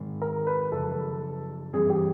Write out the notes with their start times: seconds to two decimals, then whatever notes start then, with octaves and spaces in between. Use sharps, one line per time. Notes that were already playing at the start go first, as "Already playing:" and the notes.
Already playing: G#2 D#3 G#3
0.22 A#4
0.47 B4
0.72 F#2 C#3 F3 A4
1.73 G2 E3 G3 C4 G#4
1.90 G4